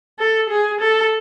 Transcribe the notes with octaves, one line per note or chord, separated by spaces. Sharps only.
A4
G#4
A4